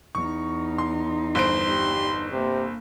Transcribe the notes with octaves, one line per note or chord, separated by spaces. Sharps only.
E2 D#4 C#6
C6
G1 C5 C6 D7
G3
C3 A#3